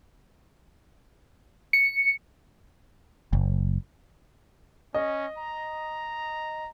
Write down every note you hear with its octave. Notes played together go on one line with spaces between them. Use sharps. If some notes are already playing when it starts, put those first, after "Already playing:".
C#7
F#1
C#4 D#5
A#5